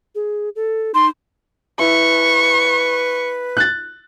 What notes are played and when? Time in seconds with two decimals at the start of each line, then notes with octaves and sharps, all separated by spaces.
0.15 G#4
0.56 A4
0.94 D#4 C6
1.79 E4 B4 C#6
3.57 F#6 A6